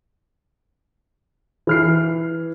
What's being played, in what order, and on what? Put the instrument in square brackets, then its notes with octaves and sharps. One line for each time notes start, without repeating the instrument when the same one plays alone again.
[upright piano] E3 F6 C7